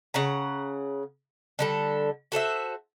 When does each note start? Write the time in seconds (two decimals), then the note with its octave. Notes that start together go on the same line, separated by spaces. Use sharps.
0.14 C#3 F#5 A#5
1.59 D3 G3 A4
2.32 F#4 A4 C5 E5